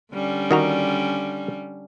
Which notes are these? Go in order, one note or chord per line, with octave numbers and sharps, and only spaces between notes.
D3 G3 C#4
D#3 F#4 A#5